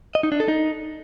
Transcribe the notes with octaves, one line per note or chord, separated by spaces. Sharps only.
D#5
D#4
D4
A4
D#4